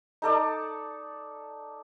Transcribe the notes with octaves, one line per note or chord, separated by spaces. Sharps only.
D#4 A4 D5